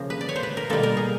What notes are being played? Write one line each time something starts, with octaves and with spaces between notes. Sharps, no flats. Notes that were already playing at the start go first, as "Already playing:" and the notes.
Already playing: C#3 F3 A#3
B4
D5
C#5
C5
B4
A#4
B2 G3 A#3 A4
A#4
G#4